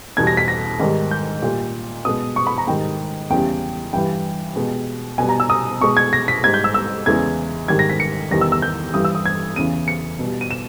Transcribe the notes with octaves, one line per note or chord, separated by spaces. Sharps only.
E2 B2 G3 G#6
A#6
B6
A#6
G#2 D#3 G3
G6
A#2 G3
B2 G#3 D#6
C#6
B5
A#5
G#2 D#3 G3 G5
E2 C#3 G3 G5
G2 E3 G3 G5
B2 G#3
B2 G3 G#5
A#5
E6
D#6
B2 G#3 C#6
G#6
A#6
B6
G#2 G3 G#6
G6
E6
E6
E2 C#3 E3 G#3 G#6
G#2 D#3 G3 G#6
A#6
B6
C#7
E2 D#3 G3 A#6
E6
E6
G6
G2 E3 G3 D#6
E6
D#6
G#6
E2 C#3 E3 D#7
C#7
B2 G3
D#7
E7